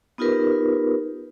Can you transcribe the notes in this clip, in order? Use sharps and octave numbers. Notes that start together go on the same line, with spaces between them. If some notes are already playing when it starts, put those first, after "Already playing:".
B3 D#4 F4 G4 A#4 B4